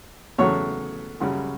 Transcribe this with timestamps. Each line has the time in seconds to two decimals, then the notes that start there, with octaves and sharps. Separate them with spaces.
0.38 E2 C#3 F#3 A3 C#5
1.20 F#2 C#3 G3